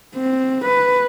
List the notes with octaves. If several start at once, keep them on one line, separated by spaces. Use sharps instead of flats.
C4
B4